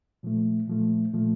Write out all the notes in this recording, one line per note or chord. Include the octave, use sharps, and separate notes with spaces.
A#2 F3 A3
A#2 F3 A3
A#2 F3 A3